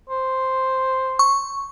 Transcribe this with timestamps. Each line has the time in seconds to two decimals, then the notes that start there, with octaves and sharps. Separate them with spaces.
0.09 C5
1.19 C#6